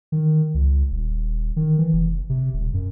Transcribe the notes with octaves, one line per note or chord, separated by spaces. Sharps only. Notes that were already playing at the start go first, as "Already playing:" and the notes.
D#3
C#2
D#1
D#3
E3
F1
C3
D#1
F#2